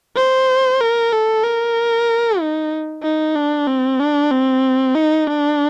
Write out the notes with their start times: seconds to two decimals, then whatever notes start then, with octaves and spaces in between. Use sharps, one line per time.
0.16 C5
0.81 A#4
1.12 A4
1.44 A#4
2.40 D#4
3.03 D#4
3.35 D4
3.67 C4
4.00 D4
4.31 C4
4.95 D#4
5.27 D4